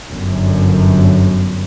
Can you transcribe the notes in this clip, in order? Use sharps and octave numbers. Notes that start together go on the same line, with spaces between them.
G1 F#2 D3